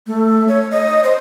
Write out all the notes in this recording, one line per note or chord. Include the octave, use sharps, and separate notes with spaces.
A3
C#5
D#5
C5